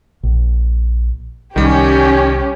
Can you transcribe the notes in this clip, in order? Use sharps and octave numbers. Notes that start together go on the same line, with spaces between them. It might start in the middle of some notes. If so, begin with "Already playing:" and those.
A#1
C2 D#3 G3 C#4 G4